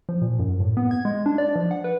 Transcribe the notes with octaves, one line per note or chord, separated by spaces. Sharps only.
F3
A#2
F#2
A2
B3
G#6
G#3
D4
D5
F3
F#5
B4